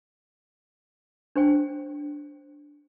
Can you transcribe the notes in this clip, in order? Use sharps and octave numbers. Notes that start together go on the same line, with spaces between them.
D4 C5 G5